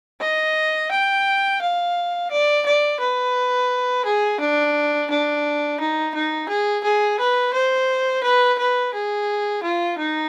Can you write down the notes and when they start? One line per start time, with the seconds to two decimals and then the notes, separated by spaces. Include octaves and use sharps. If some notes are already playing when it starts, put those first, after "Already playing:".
0.21 D#5
0.92 G5
1.61 F5
2.31 D5
2.66 D5
3.00 B4
4.05 G#4
4.40 D4
5.10 D4
5.80 D#4
6.15 D#4
6.49 G#4
6.84 G#4
7.20 B4
7.54 C5
8.23 B4
8.59 B4
8.94 G#4
9.63 F4
9.98 D#4